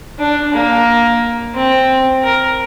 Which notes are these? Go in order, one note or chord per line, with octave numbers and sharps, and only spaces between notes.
D4
A#3
C4
A#4